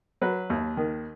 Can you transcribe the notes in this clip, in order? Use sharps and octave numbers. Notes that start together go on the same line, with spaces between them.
F#3 B4
D#2
D#3